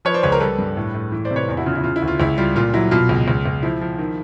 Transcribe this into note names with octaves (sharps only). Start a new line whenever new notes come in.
F3 B4 C#5
C5 D5
C#2 B4 C#5
A#4 C5
G3 A4 B4
G2
A2
A2
E3
C5 D5
C3
B4 C#5
E2
E4 F#4
C#3 F4
E4
C#3 F4
E4
D2
F4
C#2 E4
G3 F4
A#2 F4
F#3 E4
B2 F4
C#2
C#2
C#2
F3 E4
F3
D#3